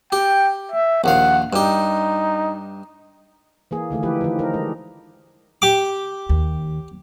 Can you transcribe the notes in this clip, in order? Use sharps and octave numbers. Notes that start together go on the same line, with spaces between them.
G4 G5
E5
A#1 D#2 F5 F#5
G2 D#4 G4
E3 A#3 G#4
D3 D#3 A3 G#4
E3 F3 E4 G4 B4
D#3 F3
D#4 A#4
G#3 D4 G4
G4 D6
D#2